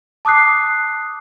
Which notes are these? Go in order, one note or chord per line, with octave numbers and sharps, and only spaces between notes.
A5 D6 D#6 F#6 C7